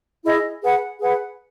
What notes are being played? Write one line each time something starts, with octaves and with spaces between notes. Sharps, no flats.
E4 G#4 D#5
G#4 B4 F#5
G#4 B4 F#5